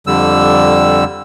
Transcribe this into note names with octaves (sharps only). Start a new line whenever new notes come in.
F2 D3 G3 E6